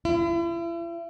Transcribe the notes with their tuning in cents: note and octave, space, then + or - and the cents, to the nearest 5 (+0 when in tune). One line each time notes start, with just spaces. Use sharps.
E4 +40